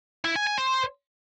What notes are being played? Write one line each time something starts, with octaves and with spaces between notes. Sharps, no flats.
E4
G#5
G#5
C5